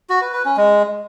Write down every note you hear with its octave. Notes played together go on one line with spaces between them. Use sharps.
F#4
B4
B4
C#4
G#3